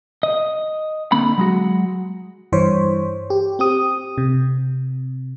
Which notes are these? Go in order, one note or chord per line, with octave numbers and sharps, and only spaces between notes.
D#5
D3 A#3 C4 B5
F#3 G#3 F#4
G2 E3 C5 C#5
G4
C4 G4 D#6
C3